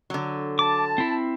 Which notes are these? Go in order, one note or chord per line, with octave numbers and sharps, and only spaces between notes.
D3 F#3
A5 D6
C4 E4